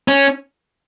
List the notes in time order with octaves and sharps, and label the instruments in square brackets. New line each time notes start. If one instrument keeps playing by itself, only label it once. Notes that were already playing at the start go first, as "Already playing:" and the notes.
[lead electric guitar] C#4